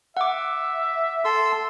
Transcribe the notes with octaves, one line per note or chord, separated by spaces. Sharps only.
E5 F#5 D6
A4 C6 E6